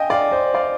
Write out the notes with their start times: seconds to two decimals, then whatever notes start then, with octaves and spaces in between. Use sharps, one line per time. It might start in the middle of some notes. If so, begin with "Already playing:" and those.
Already playing: D#5 F5 G5 G#5
0.10 D5 F5
0.31 C5 D#5
0.54 D5 F5